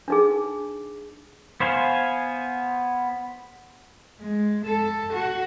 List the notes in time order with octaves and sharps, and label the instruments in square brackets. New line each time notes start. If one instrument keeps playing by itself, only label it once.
[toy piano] D4 D#4 G#4
[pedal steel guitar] B3 C5 F5 G#5
[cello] G#3
A4
F#4